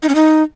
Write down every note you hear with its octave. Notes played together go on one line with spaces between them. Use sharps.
D#4
C#4
D#4